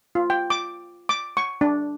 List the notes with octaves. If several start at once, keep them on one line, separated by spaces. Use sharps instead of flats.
F4
G5
D6
D6
C#6
D4